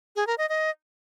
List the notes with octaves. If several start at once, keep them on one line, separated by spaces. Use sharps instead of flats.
G#4
A#4
D#5
D#5